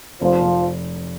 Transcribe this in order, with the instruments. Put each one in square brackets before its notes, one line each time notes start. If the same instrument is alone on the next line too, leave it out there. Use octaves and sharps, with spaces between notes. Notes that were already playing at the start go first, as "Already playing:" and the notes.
[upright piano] F1 [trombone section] F3
[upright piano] F1